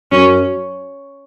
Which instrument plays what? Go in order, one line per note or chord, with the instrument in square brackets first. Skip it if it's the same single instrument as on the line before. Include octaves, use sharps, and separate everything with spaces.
[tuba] F#2 [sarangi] C#4